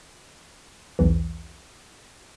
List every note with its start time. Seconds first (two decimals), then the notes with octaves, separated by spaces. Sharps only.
0.99 B1 E2 E3